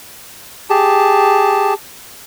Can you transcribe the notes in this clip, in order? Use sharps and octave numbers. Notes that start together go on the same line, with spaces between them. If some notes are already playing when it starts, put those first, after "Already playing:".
G4 G#4 A5